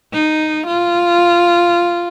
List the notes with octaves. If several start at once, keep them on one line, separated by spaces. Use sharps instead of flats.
D#4
F4